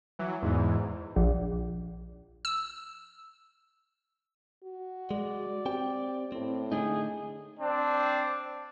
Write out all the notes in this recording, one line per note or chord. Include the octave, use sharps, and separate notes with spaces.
E3 F#3
E2 G#2 E3
A#1
E6
F#4
G#3 D5
C4 G4 G5
A2 C4
D3 A3 D#4 G#4
C4 D4